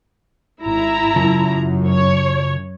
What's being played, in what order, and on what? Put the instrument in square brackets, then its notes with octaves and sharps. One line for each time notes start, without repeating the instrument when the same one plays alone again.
[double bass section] G#1 [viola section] E4 A#5
[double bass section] F#2 [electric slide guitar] C#3 F4 A5
[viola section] C#5